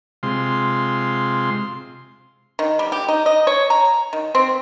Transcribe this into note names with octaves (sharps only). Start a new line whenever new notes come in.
C3 G#3 F4 C6
D#3
G3
G4
D#4
D#5
C#5
A#5
D#3
C4